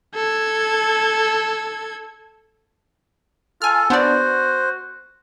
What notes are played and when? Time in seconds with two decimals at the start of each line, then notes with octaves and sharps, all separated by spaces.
0.15 A4 G#6
3.62 F4 A4 G#5 F6
3.90 B3 D4 F#4 C5 D5